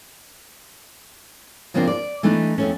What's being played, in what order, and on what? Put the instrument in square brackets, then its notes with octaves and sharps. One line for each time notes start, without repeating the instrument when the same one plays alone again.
[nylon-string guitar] C#3 F3 A#3 C4 D4 F4
D5
E3 A3 B3 D4 D#4
F2 A3 C#4